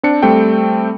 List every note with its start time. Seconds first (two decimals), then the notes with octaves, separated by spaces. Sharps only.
0.03 C4 D4 C#7
0.22 G3 A3 C4 G5